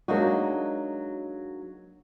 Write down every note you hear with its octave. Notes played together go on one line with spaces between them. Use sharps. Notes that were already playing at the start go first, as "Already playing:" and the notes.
F#3 G#3 A#3 D4 D#4 F#4